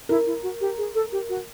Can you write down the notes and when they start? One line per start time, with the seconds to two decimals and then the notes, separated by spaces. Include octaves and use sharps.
0.09 E4 A#4
0.26 E4
0.43 F#4
0.61 G4
0.78 G#4
0.95 A4
1.12 G4
1.29 F#4